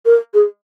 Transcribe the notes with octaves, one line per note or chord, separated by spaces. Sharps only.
A#4
G#4